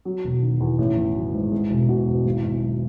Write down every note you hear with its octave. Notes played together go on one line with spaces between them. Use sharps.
F#3
E1
D#3
E2
A1
A1
F#3
G#2
G#3
E1
B2
E2
G#1
G#1
F#3